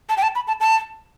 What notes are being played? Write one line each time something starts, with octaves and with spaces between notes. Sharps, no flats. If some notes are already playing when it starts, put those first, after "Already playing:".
A5
G5
A5
B5
A5
A5